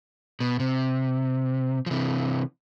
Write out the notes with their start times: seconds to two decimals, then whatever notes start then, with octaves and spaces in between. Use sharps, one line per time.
0.40 B2
0.60 C3
1.86 F3
1.91 C3 E3